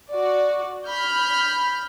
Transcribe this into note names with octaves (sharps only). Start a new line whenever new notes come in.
F#4 D5
B5 F6 G6